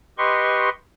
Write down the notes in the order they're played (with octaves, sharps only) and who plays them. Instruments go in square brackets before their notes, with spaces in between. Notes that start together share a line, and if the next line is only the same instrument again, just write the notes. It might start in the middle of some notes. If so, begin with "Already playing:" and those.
[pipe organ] G4 B4 D#5 C6 C#6